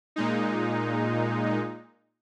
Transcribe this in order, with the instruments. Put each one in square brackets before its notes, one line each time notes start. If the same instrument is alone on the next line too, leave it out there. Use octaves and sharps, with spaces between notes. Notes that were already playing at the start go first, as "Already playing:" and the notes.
[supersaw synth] A#2 G#3 D#4